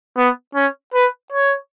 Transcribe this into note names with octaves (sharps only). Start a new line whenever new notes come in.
B3
C#4
B4
C#5